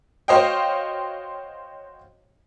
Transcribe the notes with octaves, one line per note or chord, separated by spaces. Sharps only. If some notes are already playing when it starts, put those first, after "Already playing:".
F#4 C5 C#5 D#5 F5 G5